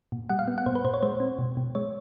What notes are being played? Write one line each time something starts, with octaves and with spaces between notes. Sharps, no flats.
A#2
G3 F#5
F5
B3
F#5
A#2 C5
B4
A#2 C5
C#5
G#3 C5
C4
B2
B2
G#3 C#5